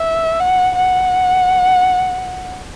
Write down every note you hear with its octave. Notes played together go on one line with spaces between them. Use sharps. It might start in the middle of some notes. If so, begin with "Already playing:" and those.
Already playing: E5
F#5
F#5